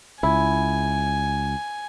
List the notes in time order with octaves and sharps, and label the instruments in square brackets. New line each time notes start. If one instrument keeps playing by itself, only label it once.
[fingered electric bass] C#2 [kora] E4 [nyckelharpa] G#5